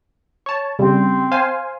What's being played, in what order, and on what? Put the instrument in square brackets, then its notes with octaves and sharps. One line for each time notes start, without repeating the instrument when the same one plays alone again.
[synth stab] C#5 A5
[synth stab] C#3 G3 [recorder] C4
[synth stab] C5 F5 G#5